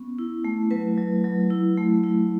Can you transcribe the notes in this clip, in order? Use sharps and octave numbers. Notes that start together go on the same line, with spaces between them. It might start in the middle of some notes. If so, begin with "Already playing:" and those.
Already playing: B3 C#4
E4
A3
F#3 B4
F#3
F#3
E4
A3
E4